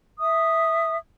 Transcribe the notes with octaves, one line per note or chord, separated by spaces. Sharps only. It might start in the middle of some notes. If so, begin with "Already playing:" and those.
E5 D#6